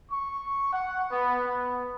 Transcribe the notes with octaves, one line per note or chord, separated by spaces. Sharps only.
C#6
F#5
B3
B3